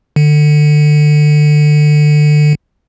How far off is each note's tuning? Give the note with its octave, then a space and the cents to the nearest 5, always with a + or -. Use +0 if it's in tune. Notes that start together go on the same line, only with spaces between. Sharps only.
D3 +25